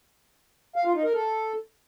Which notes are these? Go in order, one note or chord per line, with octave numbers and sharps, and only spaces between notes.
F5
F4
D#4
A#4
A4